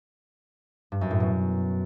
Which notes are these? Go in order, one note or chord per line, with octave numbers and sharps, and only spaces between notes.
G2
F#2
A2
B2